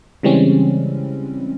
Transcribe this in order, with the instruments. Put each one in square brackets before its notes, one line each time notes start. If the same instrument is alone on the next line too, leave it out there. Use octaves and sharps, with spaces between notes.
[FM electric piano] C#3 E3 G3 G#3 C4 C#4